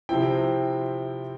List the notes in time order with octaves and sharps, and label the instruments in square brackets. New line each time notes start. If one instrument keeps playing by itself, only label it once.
[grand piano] C3 F3 C4 E4 G5